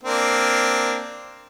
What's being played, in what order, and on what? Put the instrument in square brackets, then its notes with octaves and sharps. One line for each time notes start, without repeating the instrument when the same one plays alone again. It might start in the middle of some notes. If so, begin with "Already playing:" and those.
[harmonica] A#3 C4 D4